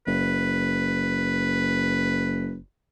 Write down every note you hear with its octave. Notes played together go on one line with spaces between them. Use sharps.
F#1 B4